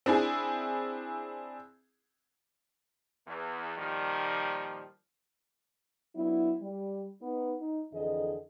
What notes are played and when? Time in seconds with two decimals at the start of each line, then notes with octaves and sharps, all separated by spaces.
0.06 C4 D4 E4 G#4
3.27 E2
3.78 A#2 D#3 F3 G3
6.16 F#3 B3 D4 E4
6.61 G3
7.22 B3 D#4
7.60 D#4
7.93 F2 D3 E3 G#4 D#5